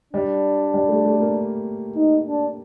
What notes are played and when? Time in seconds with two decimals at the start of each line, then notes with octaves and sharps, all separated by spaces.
0.13 G3 D4
0.74 G3
0.89 A3
1.05 A3
1.20 A#3
1.96 D#4
2.26 D4